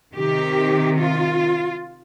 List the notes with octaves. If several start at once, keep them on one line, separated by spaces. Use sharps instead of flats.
C3 D#3 G4
F4